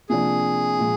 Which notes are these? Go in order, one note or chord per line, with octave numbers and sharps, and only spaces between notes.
C3 F3 A#3 D4 G#4
A#2 F3 G#3